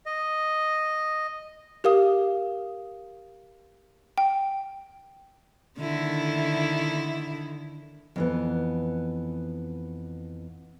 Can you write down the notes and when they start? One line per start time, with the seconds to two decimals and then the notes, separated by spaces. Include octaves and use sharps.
0.06 D#5
1.84 G4 A#4 F5 D#6
4.18 G5
5.79 D3 D#3 E4
8.16 F2 E3 B3